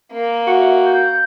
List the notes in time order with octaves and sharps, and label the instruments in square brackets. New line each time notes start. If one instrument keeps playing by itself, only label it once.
[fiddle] A#3
[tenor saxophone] F#4 [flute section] A4 E5
[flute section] G6